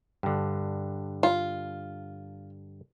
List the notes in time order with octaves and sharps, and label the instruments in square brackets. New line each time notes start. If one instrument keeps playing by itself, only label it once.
[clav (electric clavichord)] G2 D3
[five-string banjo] F4